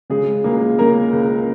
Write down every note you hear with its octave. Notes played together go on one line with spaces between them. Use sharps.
C#3 G#3 G#4
C#2 A#3 A#4
C#3 A#3 A#4
C#2